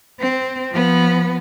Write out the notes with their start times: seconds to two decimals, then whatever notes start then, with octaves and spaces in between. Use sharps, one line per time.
0.20 C4
0.71 F3 B3